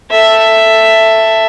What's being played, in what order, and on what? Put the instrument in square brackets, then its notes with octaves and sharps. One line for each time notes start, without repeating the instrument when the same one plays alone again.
[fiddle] A4 E5